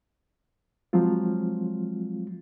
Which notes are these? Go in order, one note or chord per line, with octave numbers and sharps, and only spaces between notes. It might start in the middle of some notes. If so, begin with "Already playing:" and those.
F3 F#3 G#3 C4 F4